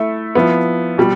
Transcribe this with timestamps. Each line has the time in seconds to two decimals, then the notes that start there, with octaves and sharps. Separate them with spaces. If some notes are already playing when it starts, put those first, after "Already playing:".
Already playing: A3 E4 E5
0.35 F3 B3 E4
0.98 B2 G3